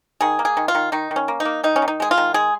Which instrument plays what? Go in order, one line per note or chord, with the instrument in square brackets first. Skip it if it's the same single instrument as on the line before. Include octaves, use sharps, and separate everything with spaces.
[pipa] D#3 G#4
A#3
G#4
D#3
F4
D#3
D#3 D#4
D#3
C#4
A#3
D#4
A#3
D#3 D#4
C#4
D#3
D#4
G#3 G#4
F4
D#3
G#3 G#4